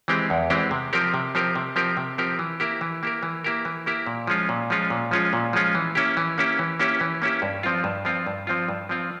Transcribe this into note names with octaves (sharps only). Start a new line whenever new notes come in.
E3 G#3 C4 G4
E2
E3 G#3 C4 G4
C3
F3 C4 G4 A#4
C3
F3 C4 G4 A#4
C3
F3 C4 G4 A#4
C3
F3 C4 G4 A#4
E3
A#3 E4 G4 A#4
E3
A#3 E4 G4 A#4
E3
A#3 E4 G4 A#4
E3
A#3 E4 G4 A#4
A#2
F3 G#3 C#4 F4
A#2
F3 G#3 C#4 F4
A#2
F3 G#3 C#4 F4
A#2
F3 G#3 C#4 F4
E3
A#3 C#4 E4 G4
E3
A#3 C#4 E4 G4
E3
A#3 C#4 E4 G4
E3
A#3 C#4 E4 G4
G2
F3 C4 F4
G2
F3 C4 F4
G2
F3 C4 F4
G2
F3 C4 F4